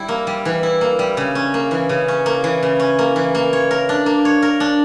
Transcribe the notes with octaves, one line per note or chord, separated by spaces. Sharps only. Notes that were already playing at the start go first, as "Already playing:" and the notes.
Already playing: G3 E4
A#3
G3
E3
E4
A#3
G3
C#3
C#4
A#3
E3
C#3
C#4
A#3
E3
C#3
C#4
A#3
E3
A#3
C#5
A#4
D4
A#3
C#5
A#4
D4